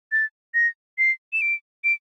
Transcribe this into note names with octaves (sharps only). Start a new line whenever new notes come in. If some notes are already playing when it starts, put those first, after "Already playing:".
A6
A#6
C7
E7
D7
D7